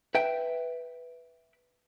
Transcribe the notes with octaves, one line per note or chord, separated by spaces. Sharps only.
B4 E5 G5